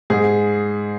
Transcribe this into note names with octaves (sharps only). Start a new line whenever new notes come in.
G#2 G#4